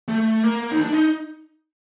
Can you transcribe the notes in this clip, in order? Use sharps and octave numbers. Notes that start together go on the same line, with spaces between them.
A3
A#3
D#4
D4
D#4